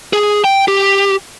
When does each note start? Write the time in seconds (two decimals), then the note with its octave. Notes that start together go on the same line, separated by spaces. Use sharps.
0.13 G#4
0.44 G5
0.68 G4